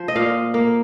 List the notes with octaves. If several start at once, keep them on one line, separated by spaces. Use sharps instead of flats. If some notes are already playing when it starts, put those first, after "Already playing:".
Already playing: F3 C5
D#5
A#2 F5
A#3